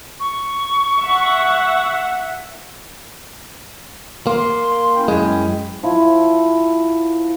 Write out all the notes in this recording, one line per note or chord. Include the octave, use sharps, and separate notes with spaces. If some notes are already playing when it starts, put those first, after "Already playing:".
C#6
E5 F#5
A#3 C6
C#4 E4 G5
F#2 G#3
F3 E4